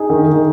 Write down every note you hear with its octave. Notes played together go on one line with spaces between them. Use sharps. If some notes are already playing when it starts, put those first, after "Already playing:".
Already playing: D#4 G#4
D#3
D#3